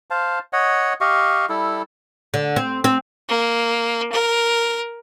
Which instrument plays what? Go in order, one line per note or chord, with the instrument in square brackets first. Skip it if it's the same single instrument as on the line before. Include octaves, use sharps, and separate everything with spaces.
[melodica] C5 F5 A5
C#5 D#5 F#5
G4 D#5 F5 C#6
G3 E4 A4
[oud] D3
C4
C4
[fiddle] A#3
A#4